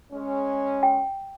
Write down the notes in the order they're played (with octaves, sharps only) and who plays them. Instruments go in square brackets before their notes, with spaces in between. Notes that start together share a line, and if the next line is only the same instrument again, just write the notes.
[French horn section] G#3 C#4
[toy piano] G5